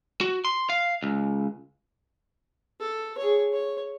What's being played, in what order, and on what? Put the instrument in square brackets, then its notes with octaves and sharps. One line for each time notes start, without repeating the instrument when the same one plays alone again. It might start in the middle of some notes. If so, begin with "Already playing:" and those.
[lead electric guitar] F#4
C6
F5
C#2
[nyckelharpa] A4
G#4 C#5
C#5